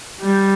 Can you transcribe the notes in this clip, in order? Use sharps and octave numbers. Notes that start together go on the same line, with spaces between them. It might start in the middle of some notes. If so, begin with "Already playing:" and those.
G3